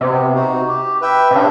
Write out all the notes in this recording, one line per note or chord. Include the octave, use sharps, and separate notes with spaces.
C3 B3
D#4 F#4
G4
B4 E5 G5
C3
C#3 D4